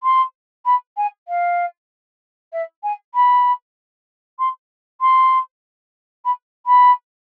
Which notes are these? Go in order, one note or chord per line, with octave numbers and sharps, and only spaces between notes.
C6
B5
G#5
F5
E5
G#5
B5
C6
C6
B5
B5